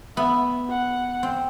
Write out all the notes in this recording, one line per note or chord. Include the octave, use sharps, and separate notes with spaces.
B3 E5
F#5
C4